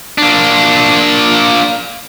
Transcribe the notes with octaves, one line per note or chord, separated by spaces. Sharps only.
A#3 D4